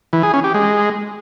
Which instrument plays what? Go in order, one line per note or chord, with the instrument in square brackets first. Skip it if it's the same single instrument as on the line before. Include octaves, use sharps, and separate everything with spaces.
[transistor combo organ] E3
G#4
C#4
G4
G#3